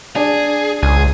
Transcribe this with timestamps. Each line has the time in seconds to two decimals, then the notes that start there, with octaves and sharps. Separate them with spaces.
0.16 D4 G#4
0.83 C#2 G#4